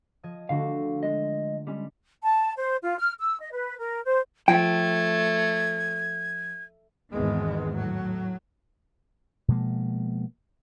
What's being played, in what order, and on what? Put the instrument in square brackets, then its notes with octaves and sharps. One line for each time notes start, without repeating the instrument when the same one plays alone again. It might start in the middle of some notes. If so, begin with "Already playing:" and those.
[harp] F3 D#5 G#6
[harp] D3 A3 D4 [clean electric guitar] F#4 F5
[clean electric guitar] G#3 D#5
G3 G#3 C#4
[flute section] A5
C5
F4
F6
E6
D#5
B4
A#4
C5
[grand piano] F3 [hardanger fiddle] A3 [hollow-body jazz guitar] G5 [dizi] G#6
[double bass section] G#1 E2 G#2 D#3 G#3 B3
A2 F#3
[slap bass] B2 F3 G#3 A#3